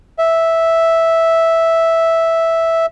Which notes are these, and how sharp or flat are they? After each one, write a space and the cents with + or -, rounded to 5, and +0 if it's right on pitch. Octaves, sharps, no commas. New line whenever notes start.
E5 -5